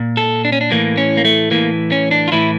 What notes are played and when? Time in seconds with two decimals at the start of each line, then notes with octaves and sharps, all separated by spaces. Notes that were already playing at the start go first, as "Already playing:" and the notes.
Already playing: A#2
0.17 A4
0.45 D4
0.52 C#4
0.61 D4
0.71 A2 E3 A#3
0.98 C#4
1.17 A#3
1.25 A3
1.51 A2 E3 A#3
1.92 C#4
2.11 D4
2.28 F4
2.32 A2 E3 E4